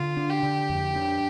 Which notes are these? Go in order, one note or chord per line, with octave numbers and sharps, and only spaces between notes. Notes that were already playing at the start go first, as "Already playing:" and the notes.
Already playing: D3 F4
D4
G4
D3
F2
D4